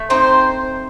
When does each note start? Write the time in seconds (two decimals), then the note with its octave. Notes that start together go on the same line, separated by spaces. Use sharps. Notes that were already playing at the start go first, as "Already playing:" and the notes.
Already playing: A3
0.10 C4 D#4 C5